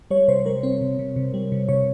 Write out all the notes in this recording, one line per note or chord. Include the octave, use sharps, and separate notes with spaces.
G3 C#5
C3 C5
G3 A#4
C4 C5
C3
C3
C3
G3
C3
C3 C#5